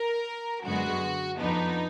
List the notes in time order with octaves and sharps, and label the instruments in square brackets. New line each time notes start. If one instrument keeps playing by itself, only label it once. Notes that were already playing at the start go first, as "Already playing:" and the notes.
Already playing: [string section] A#4
F#2 D3 G#3 B3 F#4
F2 F3 B3 D4 D#4